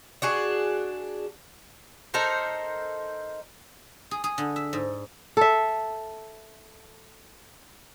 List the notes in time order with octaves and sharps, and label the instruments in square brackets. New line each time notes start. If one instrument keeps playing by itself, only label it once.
[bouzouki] D4 F#4 G#4
D#4 A4 A#4 C5
[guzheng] G#4
G#4
D3
E5
G#2
[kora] A4 E5